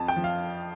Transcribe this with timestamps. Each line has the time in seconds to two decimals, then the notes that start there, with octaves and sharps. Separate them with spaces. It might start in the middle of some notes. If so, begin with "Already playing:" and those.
Already playing: F2 A5
0.08 G5
0.16 F3
0.24 F5